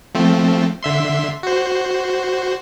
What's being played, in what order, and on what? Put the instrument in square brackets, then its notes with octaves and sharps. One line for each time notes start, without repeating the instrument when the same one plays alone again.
[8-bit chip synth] F3 A3 C4
D3 E5 C6
F#4 C5